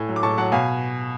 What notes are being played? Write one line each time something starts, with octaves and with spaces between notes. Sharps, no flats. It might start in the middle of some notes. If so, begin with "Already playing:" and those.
Already playing: A2 G#5
F#3
D6
A2 A5 C#6
F#3 F#5 A5
B2 F5 G#5